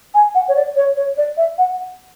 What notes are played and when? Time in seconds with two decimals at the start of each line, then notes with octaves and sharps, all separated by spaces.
0.15 G#5
0.35 F#5
0.48 C#5
0.56 D5
0.76 C#5
0.96 C#5
1.17 D5
1.37 E5
1.58 F#5